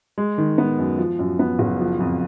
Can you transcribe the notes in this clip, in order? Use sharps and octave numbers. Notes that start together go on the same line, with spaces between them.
G#3
D#3
B3
F#2
F3
F#2
B3
F#1
F3
F2